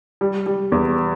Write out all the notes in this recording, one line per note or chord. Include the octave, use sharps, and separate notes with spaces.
G3
G3
E2